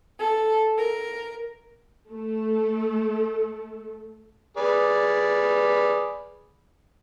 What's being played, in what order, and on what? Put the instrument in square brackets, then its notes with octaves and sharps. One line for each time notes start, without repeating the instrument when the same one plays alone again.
[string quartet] A4
A#4
[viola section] A3 A4
[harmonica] G#4 B4 D5